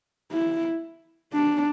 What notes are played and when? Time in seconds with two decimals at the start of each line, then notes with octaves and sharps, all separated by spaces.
0.32 E4
1.33 D4